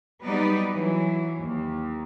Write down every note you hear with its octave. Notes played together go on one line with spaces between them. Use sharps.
F#3 G3 B3 D#4 B4 D5
E3 F#3
D#2